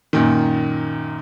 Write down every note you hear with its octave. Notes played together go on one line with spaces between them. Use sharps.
F#2 A#2 D#3